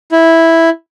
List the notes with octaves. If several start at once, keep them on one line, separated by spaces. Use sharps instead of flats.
E4